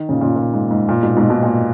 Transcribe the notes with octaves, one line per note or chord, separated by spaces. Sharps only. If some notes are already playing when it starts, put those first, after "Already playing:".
Already playing: D#3
A#2 C#3
A#2 C#3
A#2
G#2
G#2
A#2
G#2 B2
G#2 B2
G#2 B2
A#2